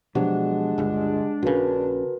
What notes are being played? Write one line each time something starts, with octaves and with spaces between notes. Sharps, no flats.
B2 F3 F#3 G#3 D4 G4 F#5
G1 C#2
A#1 C#3 F#4 A#4 B4